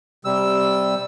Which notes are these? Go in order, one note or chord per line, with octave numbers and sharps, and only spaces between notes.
C3 G3 E6